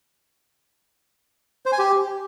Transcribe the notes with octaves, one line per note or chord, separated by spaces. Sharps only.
C5
G#5
G4